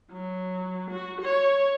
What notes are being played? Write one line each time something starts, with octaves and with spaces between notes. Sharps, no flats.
F#3
F#4
C#5